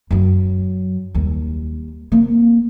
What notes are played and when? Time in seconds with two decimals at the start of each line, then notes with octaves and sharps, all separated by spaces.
0.11 F#2 F#3
1.14 D#2 G3
2.12 A#3 C4